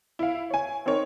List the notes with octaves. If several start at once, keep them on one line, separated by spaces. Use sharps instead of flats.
E4 F5
C#5 G#5
C4 D#4 A#4 C#5